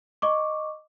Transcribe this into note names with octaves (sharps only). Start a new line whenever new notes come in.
D#5 C#6 D6